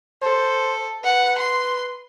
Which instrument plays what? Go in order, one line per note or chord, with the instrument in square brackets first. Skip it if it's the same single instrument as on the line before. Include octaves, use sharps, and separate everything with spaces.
[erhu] A4 [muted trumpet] C5
[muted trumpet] B4 [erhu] F#5
[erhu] C6